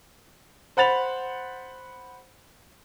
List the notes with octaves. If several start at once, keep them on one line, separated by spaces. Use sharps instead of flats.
C5 F#5 B5 A6 F7